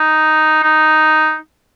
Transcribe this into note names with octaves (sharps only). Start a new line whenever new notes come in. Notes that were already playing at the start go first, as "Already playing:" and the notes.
Already playing: D#4
D#4